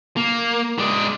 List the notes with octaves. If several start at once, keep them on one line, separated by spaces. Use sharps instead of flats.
A#3
G#3 D5